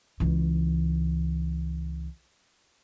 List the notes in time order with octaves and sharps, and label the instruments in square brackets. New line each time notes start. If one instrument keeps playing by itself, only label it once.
[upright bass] C#2 E3